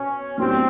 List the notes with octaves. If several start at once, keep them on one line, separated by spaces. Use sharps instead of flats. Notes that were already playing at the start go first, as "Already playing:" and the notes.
Already playing: B2 C#4
A2 F#3 B3 C4 D4 G4